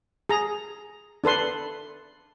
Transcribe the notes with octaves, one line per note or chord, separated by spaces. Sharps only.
G#4 A#5
D4 A4 B4 C6